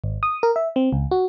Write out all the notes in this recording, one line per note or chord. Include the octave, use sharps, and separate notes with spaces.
G#1
D#6
A#4
E5
C4
C#2
F#4